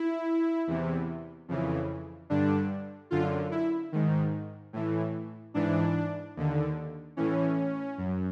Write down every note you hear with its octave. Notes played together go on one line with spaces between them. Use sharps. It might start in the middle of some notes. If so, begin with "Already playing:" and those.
Already playing: E4
E2 C3 E3
F2 C#3 E3
G2 D3 D4
F#2 D3 F4
E4
G#2 D#3
A2 E3
G#2 E3 D4
D#2 D3
A2 E3 C#4
F#2